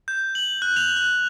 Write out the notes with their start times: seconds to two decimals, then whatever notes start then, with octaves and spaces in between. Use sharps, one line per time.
0.08 G6
0.35 F#7
0.62 F#6
0.76 F7
0.97 F#6